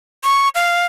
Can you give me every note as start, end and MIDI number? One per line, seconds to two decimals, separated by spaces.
0.24 0.48 85
0.55 0.86 77